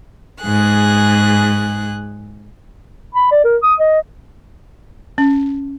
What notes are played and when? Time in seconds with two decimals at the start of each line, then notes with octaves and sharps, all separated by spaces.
0.42 G#2 G#4 F#6
3.15 B5
3.31 D5
3.44 A#4
3.63 D#6
3.79 D#5
5.18 C#4